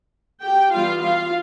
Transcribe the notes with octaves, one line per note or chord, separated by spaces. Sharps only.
G4 G5
E3 G3 B3 F4 F5
F4 F5